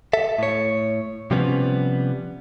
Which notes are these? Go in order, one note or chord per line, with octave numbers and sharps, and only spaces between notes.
A4 E5
A2 C#5
C3 F3 G3 B3 C#4